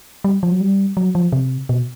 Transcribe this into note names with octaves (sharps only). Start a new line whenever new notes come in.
G3
F3
F#3
G3
F#3
F3
C3
B2